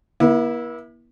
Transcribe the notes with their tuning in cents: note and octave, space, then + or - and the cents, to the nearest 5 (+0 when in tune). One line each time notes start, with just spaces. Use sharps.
A#3 +45 E4 -10